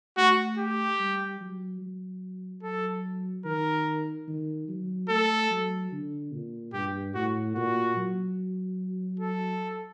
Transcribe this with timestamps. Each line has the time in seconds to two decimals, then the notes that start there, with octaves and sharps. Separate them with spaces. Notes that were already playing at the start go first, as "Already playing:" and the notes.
0.17 A3 F#4
0.58 G4
0.99 G3
1.40 F#3
1.81 F#3
2.63 F#3 A4
3.45 D#3 A#4
4.28 D#3
4.68 F#3
5.09 A3 A4
5.51 F#3
5.92 D3
6.32 A#2
6.73 G2 G4
7.15 A2 F#4
7.55 A#2 F#4
7.97 F#3
9.20 A4